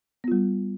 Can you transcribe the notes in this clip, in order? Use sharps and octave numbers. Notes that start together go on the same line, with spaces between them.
G3 B3 F4